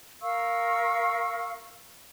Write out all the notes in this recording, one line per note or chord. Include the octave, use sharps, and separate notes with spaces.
A#4 F5 C#6 E6